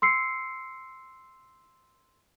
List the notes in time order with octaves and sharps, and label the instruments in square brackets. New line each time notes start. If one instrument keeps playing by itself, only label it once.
[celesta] C6 E6 C7 C#7